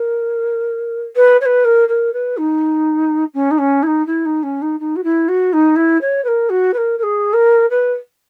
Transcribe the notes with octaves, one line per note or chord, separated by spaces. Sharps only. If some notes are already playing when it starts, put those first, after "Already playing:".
Already playing: A#4
B4
C#5
B4
A#4
A#4
B4
D#4
C#4
D#4
C#4
E4
D#4
E4
D#4
C#4
D#4
D#4
F#4
E4
F#4
D#4
E4
C#5
B4
A#4
F#4
B4
A#4
A#4
G#4
A#4
B4